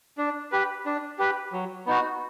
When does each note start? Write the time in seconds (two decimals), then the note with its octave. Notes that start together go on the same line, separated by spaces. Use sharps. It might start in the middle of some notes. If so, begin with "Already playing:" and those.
0.18 D4
0.52 G4 B4
0.86 D4
1.19 G4 B4
1.53 F#3
1.86 B3 D#4 F#4